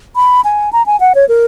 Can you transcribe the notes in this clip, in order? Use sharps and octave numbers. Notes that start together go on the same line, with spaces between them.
B5
G#5
A#5
G#5
F#5
C#5
A#4